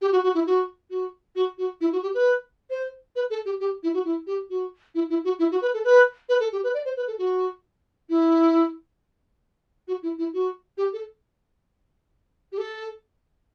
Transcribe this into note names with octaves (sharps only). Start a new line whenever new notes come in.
G4
F#4
F#4
E4
F#4
F#4
F#4
F#4
E4
F#4
G4
B4
C5
B4
A4
G4
G4
E4
F#4
E4
G4
F#4
E4
E4
F#4
E4
F#4
B4
A4
B4
B4
A4
G4
B4
D5
C5
B4
A4
F#4
E4
F#4
E4
E4
F#4
G4
A4
G4
A4